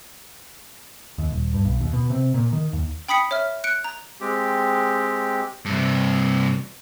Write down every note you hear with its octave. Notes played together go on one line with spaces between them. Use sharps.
D#2
D#1
G2
B1
D#2
B2
C3
A#2
D#3
D#2
G5 B5 D#6 B6 C#7
C#5 E5 F6
F#6 C#7 D7
A#5
G#3 C4 G4
G2 C3